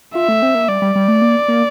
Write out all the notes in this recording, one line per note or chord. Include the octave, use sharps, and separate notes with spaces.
F4 E5
A3
C4
A#3
G3 D5
G3
G3
A3
A#3
A#3